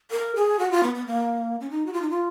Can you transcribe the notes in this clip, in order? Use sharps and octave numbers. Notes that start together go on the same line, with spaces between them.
A#4
G#4
F#4
F4
B3
B3
A#3
C#4
D#4
F#4
F4
D#4
F4